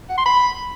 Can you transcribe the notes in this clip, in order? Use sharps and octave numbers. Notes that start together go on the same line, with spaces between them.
F#5
C6
B5